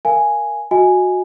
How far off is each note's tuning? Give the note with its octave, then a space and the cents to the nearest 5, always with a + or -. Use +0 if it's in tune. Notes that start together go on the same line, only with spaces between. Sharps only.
A#4 +0 F5 -25 G#5 +0
F#4 -15 D#5 +30 G#5 +0